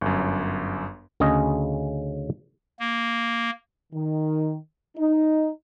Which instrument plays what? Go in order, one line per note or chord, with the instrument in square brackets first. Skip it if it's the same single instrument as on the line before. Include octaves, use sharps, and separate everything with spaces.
[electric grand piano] G1 F#2
[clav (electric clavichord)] D2 C#3 C#4 G#4 D#5
[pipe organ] A#3
[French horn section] D#3
D#4